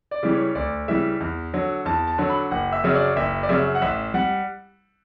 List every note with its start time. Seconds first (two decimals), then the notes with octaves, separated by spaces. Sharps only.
0.11 D5
0.23 C#3 E3 G3
0.34 C#5
0.55 D2 D5
0.88 C#3 E3 G3 E5
1.21 E2
1.53 D3 F#3
1.85 E2 A5
2.08 A5
2.18 D3 F#3
2.29 B5
2.51 F#1 F#5
2.72 E5
2.84 F#2 C#3 F#3
2.94 D5
3.16 F#1 E5
3.43 D5
3.49 F#2 C#3 F#3 E5
3.75 F#5
3.82 A1 E5
4.14 G3 F#5